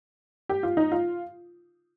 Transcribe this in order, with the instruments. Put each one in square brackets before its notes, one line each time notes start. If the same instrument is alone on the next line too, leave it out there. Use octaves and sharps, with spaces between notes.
[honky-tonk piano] G4
F4
D#4
F4